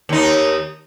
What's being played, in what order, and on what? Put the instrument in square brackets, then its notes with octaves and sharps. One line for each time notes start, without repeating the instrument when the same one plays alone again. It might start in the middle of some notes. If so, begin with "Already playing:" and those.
[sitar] D#2 D#4